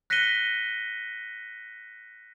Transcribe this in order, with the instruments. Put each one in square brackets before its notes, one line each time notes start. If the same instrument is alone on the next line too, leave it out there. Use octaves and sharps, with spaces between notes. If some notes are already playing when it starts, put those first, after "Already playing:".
[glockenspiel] F#6 A#6 B6 C#7 D#7 G7